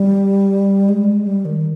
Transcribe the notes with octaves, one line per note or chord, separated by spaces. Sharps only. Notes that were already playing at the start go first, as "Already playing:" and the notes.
Already playing: G3
G#3
G3
D#3